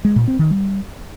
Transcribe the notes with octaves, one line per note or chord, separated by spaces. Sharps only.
G#3
A#2
C4
D#3
G3